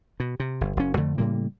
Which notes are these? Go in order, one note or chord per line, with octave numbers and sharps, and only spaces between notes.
B2
C3
G1
F#1 F#3 C#4
F2 D3 A3
A2 C#3 G3 A#3